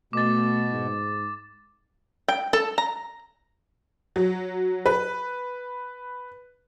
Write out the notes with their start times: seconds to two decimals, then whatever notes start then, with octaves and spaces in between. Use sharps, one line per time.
0.13 B2 A3 D6 A6
0.73 G#2
2.28 G5
2.53 A4
2.78 A#5
4.16 F#3
4.86 B4